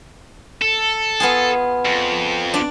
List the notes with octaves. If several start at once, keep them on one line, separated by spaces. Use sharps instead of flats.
A4
B3 F4 G#4
F2
D4 D5